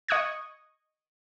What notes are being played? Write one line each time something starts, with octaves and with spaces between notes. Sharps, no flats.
D#5 C#6 D#6 F#6 G#6